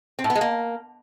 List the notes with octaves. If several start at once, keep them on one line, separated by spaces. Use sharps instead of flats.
C4
A2
B3
G#3
A#3